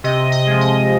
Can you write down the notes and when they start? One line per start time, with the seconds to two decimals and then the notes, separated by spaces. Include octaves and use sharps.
0.04 C3 D#5
0.32 D#5
0.47 F3 G#3
0.61 D#5